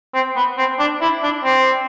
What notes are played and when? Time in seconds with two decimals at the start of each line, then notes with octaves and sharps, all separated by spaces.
0.14 C4
0.36 B3
0.58 C4
0.79 D4
1.01 E4
1.23 D4
1.44 C4